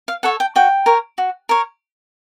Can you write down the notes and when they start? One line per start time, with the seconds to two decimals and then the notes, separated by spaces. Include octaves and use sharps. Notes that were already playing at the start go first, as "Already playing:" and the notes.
0.08 F5
0.23 A4 C#5 F#5
0.40 G5
0.56 F#4 G5
0.86 A#4 C#5
1.18 F#4
1.49 A#4 C#5